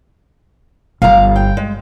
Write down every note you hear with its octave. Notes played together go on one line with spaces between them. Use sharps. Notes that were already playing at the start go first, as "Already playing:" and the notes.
G1 F5 A#5
G5
G#3